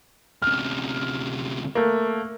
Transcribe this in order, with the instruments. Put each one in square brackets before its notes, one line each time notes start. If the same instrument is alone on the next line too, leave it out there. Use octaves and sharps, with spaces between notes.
[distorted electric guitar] D2 C3 [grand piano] F6
[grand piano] A3 A#3